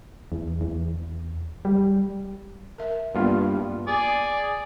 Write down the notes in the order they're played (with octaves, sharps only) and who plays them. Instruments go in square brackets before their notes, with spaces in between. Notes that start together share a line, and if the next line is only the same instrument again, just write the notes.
[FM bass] E2
E2
G3
[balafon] A#4 E5
[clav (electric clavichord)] G2 F4 [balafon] A#3 B3
[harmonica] G#4 D5